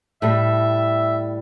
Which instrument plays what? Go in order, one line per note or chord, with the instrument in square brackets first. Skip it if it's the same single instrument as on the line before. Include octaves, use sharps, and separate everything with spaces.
[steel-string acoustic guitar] A2 G3 [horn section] E5